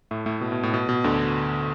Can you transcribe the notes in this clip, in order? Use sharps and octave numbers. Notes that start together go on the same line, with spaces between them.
A2 A3
A2 A3
B2
B2
A2
B2
B2
D2 D3